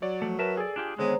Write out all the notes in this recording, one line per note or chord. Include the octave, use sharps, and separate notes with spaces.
F#3 C#5 D5
F3 A3
A#4 B4 C#5 E5 A5
G#4 A4 D5 G#5
D4 F4 G4
D3 D#3 G#3 B3 C5 C#5 A#5